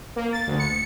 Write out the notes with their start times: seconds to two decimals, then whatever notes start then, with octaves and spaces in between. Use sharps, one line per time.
0.16 A#3
0.33 A6
0.47 D2
0.59 C#7